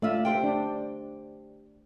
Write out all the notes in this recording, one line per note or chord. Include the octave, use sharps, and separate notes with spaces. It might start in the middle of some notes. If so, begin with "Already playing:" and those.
A3 D4 F4 E5
G4 C5 G5
D4